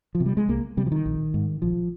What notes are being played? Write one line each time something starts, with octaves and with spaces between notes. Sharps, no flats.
F3
C3
G3
G#3
C2 A#3
C3 G3
F3
D#3
A#1
G#2
A#1 F3